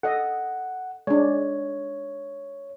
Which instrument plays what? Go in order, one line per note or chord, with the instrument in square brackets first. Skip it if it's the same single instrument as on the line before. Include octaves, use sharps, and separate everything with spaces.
[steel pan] A4 D#5 [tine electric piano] F#5
[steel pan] G#3 D4 [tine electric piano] C#5